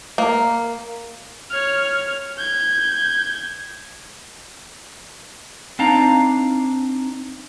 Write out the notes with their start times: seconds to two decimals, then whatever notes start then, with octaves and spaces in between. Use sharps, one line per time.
0.18 A#3
1.50 C#5 F6
2.38 G6 G#6
5.79 C4 D4 D#4 F5 A5 A#5